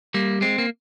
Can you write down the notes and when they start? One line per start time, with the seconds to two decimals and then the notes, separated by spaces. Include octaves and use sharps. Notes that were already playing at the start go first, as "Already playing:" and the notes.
0.14 G3 A#3
0.41 G#3 C4
0.58 A#3